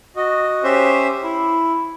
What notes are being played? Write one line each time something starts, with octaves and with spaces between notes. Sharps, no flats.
F#4 D#5
C#4 G4 C5 E5
E4